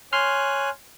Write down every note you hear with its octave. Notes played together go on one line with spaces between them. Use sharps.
C#5 G#5 C6 F6 F#6